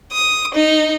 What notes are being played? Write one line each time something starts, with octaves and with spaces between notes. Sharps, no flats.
D#6
D#4